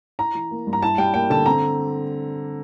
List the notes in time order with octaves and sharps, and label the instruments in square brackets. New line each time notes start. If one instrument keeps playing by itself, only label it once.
[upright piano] E4 A#5
E3
A#3
G2
A#5
E4 A5
G3 G5
A#3 G5
D3 A5
C4 A#5